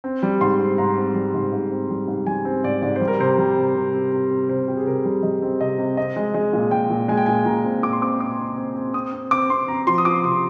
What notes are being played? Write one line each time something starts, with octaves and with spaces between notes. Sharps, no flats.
C4
G3
G#2 C6
C4
G#2 A#5
C4
G3
G#2
G#2
C4
G3
G#2
G3 G#5
C4
G#2 D5
G#2 D5
G3 C5
A#4
C3 C5
G3
C3
C3
C3
C3
C3
C3 C5
C3 G4
G#4
C3 A#4
G3
G3 D#5
C4
C3 D#5
C3
C4 D#5
G#3
G#3
A#2
G#3 G5
A#2
G#3 G#5
G5
A#2 G#5
A#2 A#5
C4
A#2 D6
C6
C4 D6
C4 D6
C4
C4
C4
C4 D#6
C4
C4 D6
C4 C6
C4 A#5
F3 C6
D#6
F3 D6
C3 D#6